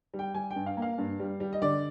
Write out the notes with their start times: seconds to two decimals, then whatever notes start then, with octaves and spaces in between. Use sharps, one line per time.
0.14 G3
0.19 G5
0.34 G3 G#5
0.50 G5
0.56 G2
0.66 F5
0.77 A#3
0.82 F5
0.98 G2
1.20 G3
1.40 G3
1.53 D#5
1.62 D3 D5